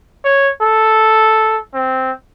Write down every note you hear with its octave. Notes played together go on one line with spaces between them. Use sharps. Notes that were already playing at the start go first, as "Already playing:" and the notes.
C#5
A4
C4